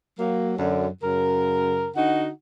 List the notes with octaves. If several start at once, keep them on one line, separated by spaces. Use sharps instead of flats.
F#3 A#3
F#2 D3
F#2 C#3 A#4
D3 D#4 F#4 F#5